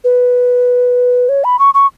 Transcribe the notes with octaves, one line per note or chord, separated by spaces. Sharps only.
B4
C#5
B5
C#6
C#6